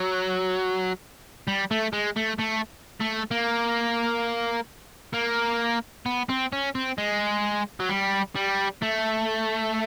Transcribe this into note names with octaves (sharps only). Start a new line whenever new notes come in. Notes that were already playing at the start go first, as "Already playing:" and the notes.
Already playing: F#3
G3
A3
G#3
A3
A3
A3
A#3
A#3
B3
C4
C#4
C4
G#3
F#3
G3
G3
A3